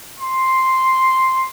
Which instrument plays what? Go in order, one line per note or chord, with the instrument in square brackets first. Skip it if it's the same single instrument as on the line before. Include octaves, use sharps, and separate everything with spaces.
[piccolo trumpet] C6